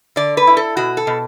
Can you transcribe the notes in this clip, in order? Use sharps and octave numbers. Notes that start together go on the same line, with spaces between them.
D3 D5
B4
E4
A4
B2 F#4
A4
B2